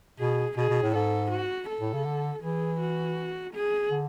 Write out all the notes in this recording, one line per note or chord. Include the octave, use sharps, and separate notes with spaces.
B2 G#4
B2 G#4
B2
A2
G#2 A4
F#4
A4
A2
C#3
D3
E3 G#4
F#4
G#4
D3